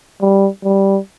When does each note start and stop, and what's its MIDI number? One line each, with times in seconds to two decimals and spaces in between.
0.21 0.47 55
0.63 0.98 55